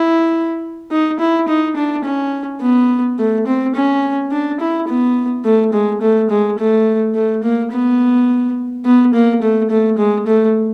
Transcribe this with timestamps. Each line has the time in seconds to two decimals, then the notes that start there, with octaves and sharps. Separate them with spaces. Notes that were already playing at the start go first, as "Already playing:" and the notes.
Already playing: E4
0.91 D#4
1.20 E4
1.48 D#4
1.76 D4
2.05 C#4
2.61 B3
3.19 A3
3.47 C4
3.75 C#4
4.32 D4
4.60 E4
4.88 B3
5.45 A3
5.73 G#3
6.02 A3
6.30 G#3
6.59 A3
7.15 A3
7.43 A#3
7.71 B3
8.85 B3
9.14 A#3
9.42 A3
9.70 A3
9.98 G#3
10.27 A3